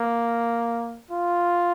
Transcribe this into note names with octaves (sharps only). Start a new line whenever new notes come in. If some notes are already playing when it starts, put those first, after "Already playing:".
Already playing: A#3
F4